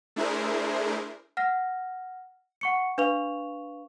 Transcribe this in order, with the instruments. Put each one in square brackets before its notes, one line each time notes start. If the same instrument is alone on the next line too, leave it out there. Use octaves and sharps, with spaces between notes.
[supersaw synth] A3 D4 E4 G#4 A#4 C5
[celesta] F#5 F6 A#6
F#5 C#6 C#7
D4 B4 F5 C#6 F7